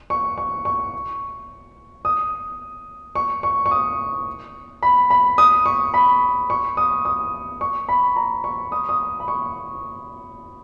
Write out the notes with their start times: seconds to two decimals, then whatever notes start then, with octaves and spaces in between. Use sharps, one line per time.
0.10 C#6
0.38 C#6
0.65 C#6
2.05 D#6
3.15 C#6
3.43 C#6
3.66 C#6
3.71 D#6
4.82 B5
5.10 B5
5.38 D#6
5.66 C#6
5.94 B5
6.50 C#6
6.77 D#6
7.05 D#6
7.61 C#6
7.89 B5
8.16 A#5
8.44 C#6
8.72 D#6
8.89 D#6
9.20 B5
9.28 C#6